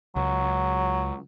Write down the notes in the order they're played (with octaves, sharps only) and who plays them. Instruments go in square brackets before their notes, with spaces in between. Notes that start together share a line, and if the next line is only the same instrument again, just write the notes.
[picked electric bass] C#2 [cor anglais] F#3